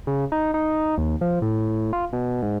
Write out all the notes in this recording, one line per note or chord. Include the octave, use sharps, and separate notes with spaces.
C#3
D#4
D#4
D#2
F3
A2
F4
B2
G#2